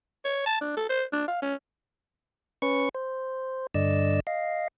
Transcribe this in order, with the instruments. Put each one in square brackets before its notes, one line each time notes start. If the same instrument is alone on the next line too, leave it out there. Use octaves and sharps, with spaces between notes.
[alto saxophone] C#5
A5
D4
A4
C5
D4
F5
C#4
[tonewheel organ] C#4 B4 C#6
C5
G2 D3 D5 D#5 E6
D#5 F5